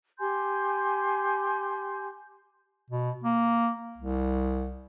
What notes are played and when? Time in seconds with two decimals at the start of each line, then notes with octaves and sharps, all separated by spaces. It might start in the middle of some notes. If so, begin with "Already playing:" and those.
0.18 G4 G#5 C6 G6
2.90 B2
3.24 A#3
3.98 C2